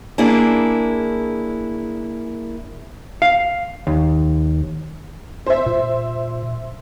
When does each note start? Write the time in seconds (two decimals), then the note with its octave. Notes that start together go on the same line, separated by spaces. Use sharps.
0.18 A#3 D4 E4 G#4
3.22 F5
3.87 D#2
5.46 C5 E5
5.66 A#2